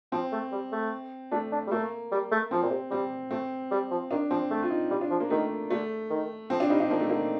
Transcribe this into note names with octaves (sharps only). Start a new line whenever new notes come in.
F3 C4
A3
G3
A3
A3 D4
D4
G3
A3 A#3
G3
A3
F3 C4
A#2
C3
G3 C4
A3 C4
G3
F3
D#3 D4
F3 C4
A3
F4
D#4
G3 F4
D4
F3
A#3
D#3 A3
D3 A3
D#3
F3 C4
D4
G3 D#4
D4
F3 A#3
A3
D3 A#3